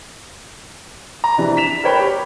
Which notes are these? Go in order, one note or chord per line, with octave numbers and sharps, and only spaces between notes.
A#5
C3 E3 D4
B6 E7 F7
A#4 B4 C#5 G5 A#5 B5
G4